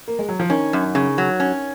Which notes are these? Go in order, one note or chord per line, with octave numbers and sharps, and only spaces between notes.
A#3
G#3
F#3
F3
D#3 C#4
F#2
C#3
F#3
C#4